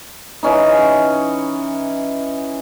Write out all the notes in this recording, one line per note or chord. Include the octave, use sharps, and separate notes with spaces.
E3 C#4 D#4